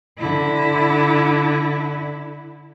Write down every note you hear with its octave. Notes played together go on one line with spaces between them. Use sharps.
D3 E4